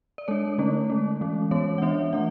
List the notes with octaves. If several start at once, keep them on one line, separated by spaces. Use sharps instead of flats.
D5
G#3 D4 C#5
D3 A3 C#4
G#3 C#4
E3 G#3 C#4
E3 G#3 B3 C#5
F#5
E3 B3 D4 E5
E3 A3 D4 F#5